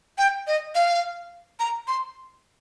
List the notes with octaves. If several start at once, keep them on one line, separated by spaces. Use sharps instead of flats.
G5
D#5
F5
A#5
C6